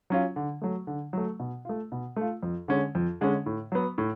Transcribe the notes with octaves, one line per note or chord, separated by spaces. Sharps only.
F#3 C#4 F4
D3
F#3 A3
D3
F#3 A3
B2
A3 F4
B2
A3 F4
F2
D3 G#3 C#4
F2
D3 G#3 C#4
A2
F#3 B3
A2